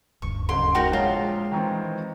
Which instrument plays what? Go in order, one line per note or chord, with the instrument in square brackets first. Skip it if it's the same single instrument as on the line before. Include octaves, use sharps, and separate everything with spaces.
[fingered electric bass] D#1 D2 G2 [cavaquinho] C#6
[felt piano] F#1 D7 [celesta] G4 A4 F#5 [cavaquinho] C6
[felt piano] G#2 [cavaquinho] D#4 F#4 A#4 [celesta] G5
[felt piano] A#1 G5 [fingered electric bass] G#3 [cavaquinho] F4 [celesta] C#5 A5 A#5
[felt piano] D#3 E3 C4 [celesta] G5 A#5 C#6